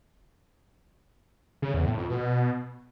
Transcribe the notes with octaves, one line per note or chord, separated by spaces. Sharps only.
C#3
E2
A2
F2
B2